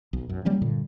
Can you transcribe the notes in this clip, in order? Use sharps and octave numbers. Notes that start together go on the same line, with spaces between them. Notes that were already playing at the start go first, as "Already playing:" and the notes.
B1
F#2
F#3 G3 A#3 C#4
G2 A#2 D3